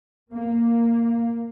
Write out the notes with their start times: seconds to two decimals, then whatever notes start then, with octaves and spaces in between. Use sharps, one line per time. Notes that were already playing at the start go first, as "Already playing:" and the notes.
0.34 A#3